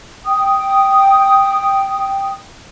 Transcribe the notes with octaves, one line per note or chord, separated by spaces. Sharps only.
G5 D#6